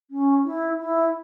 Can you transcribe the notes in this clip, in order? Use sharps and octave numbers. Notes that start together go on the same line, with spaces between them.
C#4
E4
E4